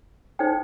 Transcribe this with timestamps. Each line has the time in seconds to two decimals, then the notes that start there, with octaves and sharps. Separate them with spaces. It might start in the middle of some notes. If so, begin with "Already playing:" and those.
0.39 D#4 A4 C5 G5